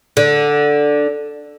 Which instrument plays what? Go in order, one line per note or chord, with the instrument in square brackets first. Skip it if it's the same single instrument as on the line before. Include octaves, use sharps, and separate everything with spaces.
[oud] D3